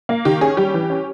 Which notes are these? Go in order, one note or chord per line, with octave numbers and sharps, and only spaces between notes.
A#3
D#3 G4
C#4 G#4
G3 G4
E3
C#4